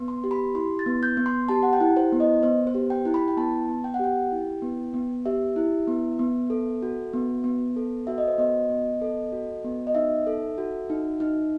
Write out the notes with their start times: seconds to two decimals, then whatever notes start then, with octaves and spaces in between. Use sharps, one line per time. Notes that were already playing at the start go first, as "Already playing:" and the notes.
Already playing: B3
0.08 C6
0.24 G4
0.31 B5
0.55 E4 C6
0.79 A6
0.86 B3
1.03 G6
1.17 B3
1.26 C6
1.49 G4 A5
1.63 F#5
1.73 G5
1.80 E4
1.97 C5
2.12 B3
2.20 D#5
2.43 B3 C5
2.67 C5
2.75 G4
2.90 G5
3.05 E4
3.14 B5
3.28 G5
3.37 B3 A5
3.69 B3
3.84 G5
3.94 F#5
3.99 G4 G5
4.32 E4
4.62 B3
4.94 B3
5.26 G4 E5
5.56 E4
5.88 B3
6.19 B3
6.50 A4
6.82 F#4
7.13 B3
7.44 B3
7.76 A4
8.07 F#4 E5
8.18 D#5
8.28 C5
8.38 B3 D#5
8.70 B3
9.01 A4
9.33 F#4
9.64 B3
9.87 D#5
9.95 D#4 E5
10.27 A4
10.58 F#4
10.90 D#4
11.20 D#4